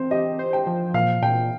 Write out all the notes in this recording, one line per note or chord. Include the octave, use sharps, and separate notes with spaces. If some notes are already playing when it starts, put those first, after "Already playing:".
Already playing: C4 C5
G4 D#5
C5
G5
F3
A#2 F5
A#2 G5